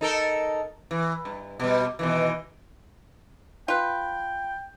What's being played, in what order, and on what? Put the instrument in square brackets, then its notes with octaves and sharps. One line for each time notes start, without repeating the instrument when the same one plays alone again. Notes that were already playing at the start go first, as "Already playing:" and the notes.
[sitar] D#4 A4 A#4
E3
G2
B2 G3
B2 D#3 E3
[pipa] F4 B4 [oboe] G5